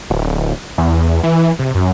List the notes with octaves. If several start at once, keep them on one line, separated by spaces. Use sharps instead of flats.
D1
E2
E3
C3
F#2